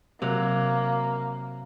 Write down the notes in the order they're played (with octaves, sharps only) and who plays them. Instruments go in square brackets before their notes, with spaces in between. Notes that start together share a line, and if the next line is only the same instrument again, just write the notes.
[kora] C3 F#3 [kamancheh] A#3